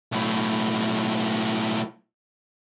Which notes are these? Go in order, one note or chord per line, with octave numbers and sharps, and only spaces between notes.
B1 A2